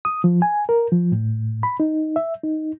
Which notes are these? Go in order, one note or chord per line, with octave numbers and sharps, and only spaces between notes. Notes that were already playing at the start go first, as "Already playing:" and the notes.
D#6
F3
G#5
A#4
F3
A2
B5
D#4
E5
D#4